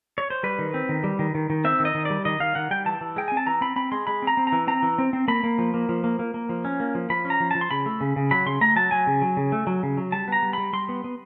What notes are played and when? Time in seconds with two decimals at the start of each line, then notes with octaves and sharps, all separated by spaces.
0.18 C#5
0.30 C5
0.43 G3 B4
0.59 D#3
0.74 C4
0.89 D#3
1.04 G3
1.19 D#3
1.35 D#3
1.50 D#3
1.64 C4 E5
1.80 D#3
1.85 D#5
1.95 D#3
2.05 G3 D5
2.25 D#3 D#5
2.40 D#3 F5
2.55 D#3 F#5
2.71 G3 G5
2.86 E3 A5
3.01 E3
3.16 G#3 G5
3.28 C4 G#5
3.37 A5
3.47 E3 A#5
3.61 C4 B5
3.76 C4 B5
3.92 G#3 C6
4.07 G#3 B5
4.22 C4
4.27 A#5
4.37 C4
4.47 A#5
4.52 E3
4.67 C4 A#5
4.83 E3
4.98 C4
5.13 C4
5.28 A#3 B5
5.44 A#3
5.58 F3
5.74 A#3
5.89 F3
6.04 A#3
6.19 A#3
6.34 A#3
6.49 F3
6.65 C#4
6.80 A#3
6.95 F3
7.10 F3 B5
7.25 C#4
7.30 A#5
7.40 F3
7.51 F3 A5
7.61 C6
7.71 C#3 B5
7.86 A3
8.01 C#3
8.16 C#3
8.31 F#3 B5
8.46 C#3 C6
8.61 A3 A#5
8.76 F#3 A5
8.91 F#3 G#5
9.07 C#3
9.22 F#3
9.37 C#3
9.52 A3
9.67 F#3
9.83 C#3
9.97 F#3
10.12 G3 A5
10.28 B3 A#5
10.43 G3
10.53 G3 B5
10.73 G3 C6
10.89 B3
11.04 B3